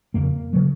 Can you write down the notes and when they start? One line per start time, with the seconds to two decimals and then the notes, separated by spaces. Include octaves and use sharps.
0.14 F2 C#3 A#3
0.53 C#3 F#3